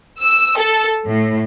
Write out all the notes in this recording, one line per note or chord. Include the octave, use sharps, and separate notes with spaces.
E6
A4
A2